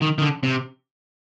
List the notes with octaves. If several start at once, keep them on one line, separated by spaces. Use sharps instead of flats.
D#3
D#3
D3
C3